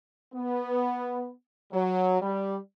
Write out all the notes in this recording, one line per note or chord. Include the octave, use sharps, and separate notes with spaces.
B3
F#3
G3